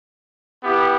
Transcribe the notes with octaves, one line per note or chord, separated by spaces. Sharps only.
B3 E4 G4